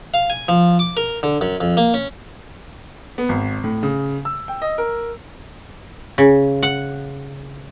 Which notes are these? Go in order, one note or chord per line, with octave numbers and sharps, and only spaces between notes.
F5
G#5
F3
D6
A#4
D3
F#2
F2
A#3
C#4
B3
G#1
A2
C#3
E6
G5
D#5
A#4
C#3
F#5